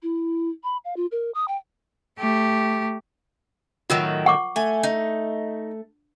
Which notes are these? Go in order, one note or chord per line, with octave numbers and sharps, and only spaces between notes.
E4
B5
F5
F4
A#4
D#6
G5
A3 G4
A2 D#3 F#3 F4 A#4
F#5 C#6 D6
A3 G#5
D#4